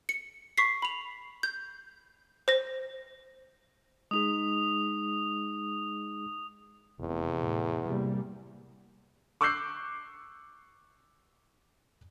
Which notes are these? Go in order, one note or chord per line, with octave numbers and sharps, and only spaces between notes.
C#7
C#6 B6 C7
B5 F7
G6
C5 A#6
G#3 D#4 G#4 D#6 F7
F1 E2
A2
C3 G3 A#3
C#6 D6 E6 F#6 G6 C7